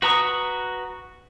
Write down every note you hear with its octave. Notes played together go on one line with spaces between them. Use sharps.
F#4 B4 A#5 C#6 D#6